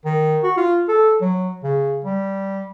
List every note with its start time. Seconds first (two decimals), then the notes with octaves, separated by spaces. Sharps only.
0.05 D#3
0.43 F#4
0.57 F4
0.88 A4
1.21 F#3
1.64 C#3
2.04 G3